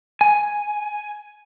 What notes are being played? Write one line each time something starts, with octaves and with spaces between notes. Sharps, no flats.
G#5